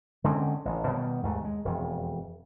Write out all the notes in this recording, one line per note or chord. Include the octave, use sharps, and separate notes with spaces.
D3 G#3 C4 C#4
A1
B2 D#3 G3
D#2 G#2 A3
G#3
E1 F2